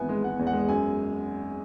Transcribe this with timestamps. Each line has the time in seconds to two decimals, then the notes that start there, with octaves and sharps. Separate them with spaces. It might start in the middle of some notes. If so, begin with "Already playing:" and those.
Already playing: G#1 E3 B3 G#5
0.09 G#3
0.23 G#3 F#5
0.39 E2
0.47 F#5
0.53 G#3
0.68 F#2 G#5